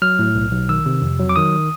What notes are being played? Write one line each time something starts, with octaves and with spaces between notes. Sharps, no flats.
F#3 F6
A2
B1
B1
D#3 E6
C3
F2
F#3
D6
D#3 D#6